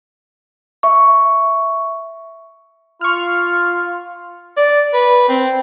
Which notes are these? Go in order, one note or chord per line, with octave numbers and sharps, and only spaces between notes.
E5 C#6
F4 C#6 F6
D5
B4
C4